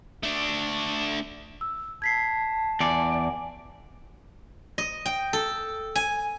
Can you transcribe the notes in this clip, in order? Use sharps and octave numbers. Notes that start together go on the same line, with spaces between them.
A3 D4
E6
A5 G#6 B6 C7
E2 D5 G#5
D#5
G5
A4
G#5